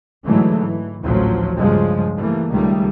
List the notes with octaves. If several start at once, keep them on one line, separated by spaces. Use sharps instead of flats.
G#2 D3 E3 F#3 G#3 A3
E3
A1 D2 A#2 F3 F#3
G2 C#3 F3 G3 G#3
E3 G3 A3 A#3
C#2 D#3 G3 A3